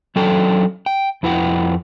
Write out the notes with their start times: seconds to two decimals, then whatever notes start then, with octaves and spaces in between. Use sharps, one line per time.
0.16 F#3 C#4 D4 A4 G5
0.86 G5
1.23 F2 E4 B4 F#5 G5